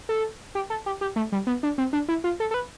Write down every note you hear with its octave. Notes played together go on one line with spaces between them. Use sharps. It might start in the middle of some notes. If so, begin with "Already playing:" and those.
A4
G4
A4
G4
G4
A3
G3
B3
D4
C4
D4
E4
F4
A4
A4
B4